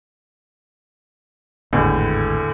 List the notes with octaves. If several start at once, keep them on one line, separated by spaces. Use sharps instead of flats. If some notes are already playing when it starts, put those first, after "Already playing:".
G#1 E2 A2 D3